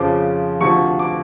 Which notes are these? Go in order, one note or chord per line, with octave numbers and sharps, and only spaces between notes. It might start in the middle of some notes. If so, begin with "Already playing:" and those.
Already playing: F2 C#3 F3 D6
D2 C3 F3 C#6
D6